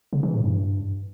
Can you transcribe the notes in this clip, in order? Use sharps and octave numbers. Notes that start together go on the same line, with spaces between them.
C#3
E3
A2
G2